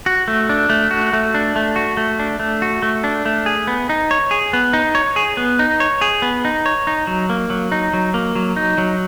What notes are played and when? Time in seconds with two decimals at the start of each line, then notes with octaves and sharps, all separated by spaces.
0.06 F#4
0.28 A3
0.49 D4
0.69 A3
0.91 F#4
1.13 A3
1.34 D4
1.56 A3
1.76 F#4
1.97 A3
2.19 D4
2.40 A3
2.62 F#4
2.82 A3
3.04 D4
3.26 A3
3.46 G#4
3.67 B3
3.89 D#4
4.11 C#5
4.31 G#4
4.53 B3
4.73 D#4
4.95 C#5
5.16 G#4
5.37 B3
5.59 D#4
5.80 C#5
6.01 G#4
6.22 B3
6.45 D#4
6.66 C#5
6.87 D#4
7.07 F#3
7.30 A#3
7.50 F#3
7.72 D#4
7.93 F#3
8.14 A#3
8.35 F#3
8.56 D#4
8.78 F#3